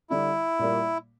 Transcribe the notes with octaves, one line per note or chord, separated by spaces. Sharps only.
D3 G3 D4 E4
A#2 G3 A#3